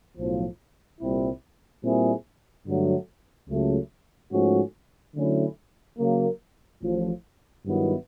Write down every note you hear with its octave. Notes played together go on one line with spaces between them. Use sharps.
B1 A2 F3
C2 A#2 G3 C4 E4
A#2 G3 C4 E4 G#4
G2 D3 F#3 A3
C#2 C#3 F#3 A3
G#2 F3 A3 C#4 F#4
D3 F#3 A3 C#4 E4
C#3 F#3 A#3
A1 A2 F3
G2 D#3 F#3 B3 E4